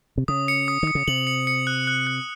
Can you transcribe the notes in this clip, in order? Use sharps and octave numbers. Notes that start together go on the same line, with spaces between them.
C3
C#3 D#6
C#7
D#6
D#3 D#6
C#3
C3 F#7
C#7
C#7
F#6
F#6
F#6